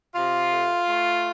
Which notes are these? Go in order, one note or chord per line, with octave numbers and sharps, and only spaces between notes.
C3 F4
A3
A3